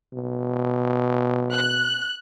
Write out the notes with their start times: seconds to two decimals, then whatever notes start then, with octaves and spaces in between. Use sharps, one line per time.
0.13 B2
1.53 F#6